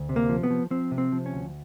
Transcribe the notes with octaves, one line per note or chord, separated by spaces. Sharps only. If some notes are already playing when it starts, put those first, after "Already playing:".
Already playing: D2
C3
A#3
F3
B3
F3
F3 C4
C3
C4
F3
C#4
D2